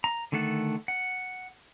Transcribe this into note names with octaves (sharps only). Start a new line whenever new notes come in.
A#5
D3 D#3 A3 A4 F#5
F#5